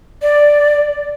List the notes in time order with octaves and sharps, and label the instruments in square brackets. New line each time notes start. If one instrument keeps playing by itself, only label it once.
[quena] D5